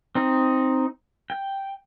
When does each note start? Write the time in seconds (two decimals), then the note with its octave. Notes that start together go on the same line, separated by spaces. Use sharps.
0.15 C4 D#4
1.30 G5